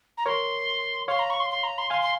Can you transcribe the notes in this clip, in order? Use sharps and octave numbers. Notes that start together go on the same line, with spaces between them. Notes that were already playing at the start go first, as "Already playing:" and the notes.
A#5
A#4 C#5 C6
C#5 F5 C6
A#5
C#6
C6
C6
A#5
C6
F5 G#5 C6
C6